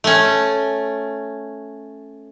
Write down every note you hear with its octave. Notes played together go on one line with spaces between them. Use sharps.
A3 C#4